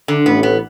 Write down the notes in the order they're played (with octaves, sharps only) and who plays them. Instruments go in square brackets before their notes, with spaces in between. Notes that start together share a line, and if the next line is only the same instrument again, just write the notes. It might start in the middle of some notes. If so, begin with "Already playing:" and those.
[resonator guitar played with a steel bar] D3
[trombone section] A1 A2 [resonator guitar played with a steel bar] B3
[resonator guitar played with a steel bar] B3